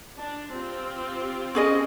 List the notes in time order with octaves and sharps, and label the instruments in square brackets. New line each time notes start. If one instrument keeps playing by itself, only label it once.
[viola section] D4
C4 F4 G4
[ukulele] C#4 G#4 D#5